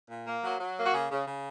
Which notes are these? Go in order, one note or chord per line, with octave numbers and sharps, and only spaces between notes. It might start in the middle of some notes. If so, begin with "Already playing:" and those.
A#2
A#3
F#3
F#3
A#3
F#4
C#3 G#4
C#3
C#3